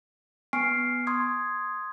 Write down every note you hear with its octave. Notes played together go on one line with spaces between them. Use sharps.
B3 G#5 C#6 F6 C7 D7
C6 D#6 G#6